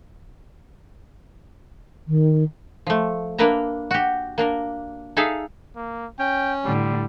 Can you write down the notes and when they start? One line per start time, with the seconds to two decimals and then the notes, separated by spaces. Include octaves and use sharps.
2.08 D#3
2.87 F3 A3
3.38 A#3 D4 A#4 B4 E5 A#5
3.91 F#4 G4
4.38 A#3 D4 A#4
5.17 D#4 G#4 A4 E5 F5
5.76 A#3
6.19 C#4 G5
6.65 A2 D3 G3